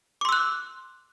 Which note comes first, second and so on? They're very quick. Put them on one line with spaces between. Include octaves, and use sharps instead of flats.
D6 C6 E6 F#6